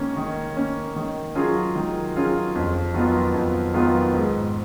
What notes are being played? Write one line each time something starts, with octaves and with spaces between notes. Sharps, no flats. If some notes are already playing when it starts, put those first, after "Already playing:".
Already playing: D#3 A#3 C#4
D#3
A#3 C#4
D#3
F#3 C#4 F4 G#4
D#3
F#3 C#4 F4 G#4
F2
D#3 F#3 B3 F4
F2
D#3 F#3 B3 F4
G#2